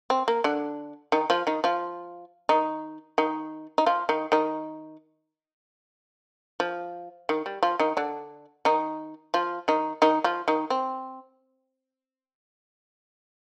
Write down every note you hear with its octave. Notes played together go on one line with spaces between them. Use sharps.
C4
A#3
D3 D4
D#3 D#4
F3 F4
D#3 D#4
F3 F4
D#3 D#4
D#3 D#4
D#4
F3 F4
D#3 D#4
D#3 D#4
F3
D#3
G3
F3 F4
D#3 D#4
D3 D4
D#3 D#4
F3 F4
D#3 D#4
D#3 D#4
F3 F4
D#3 D#4
C4